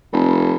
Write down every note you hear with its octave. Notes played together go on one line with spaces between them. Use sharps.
F1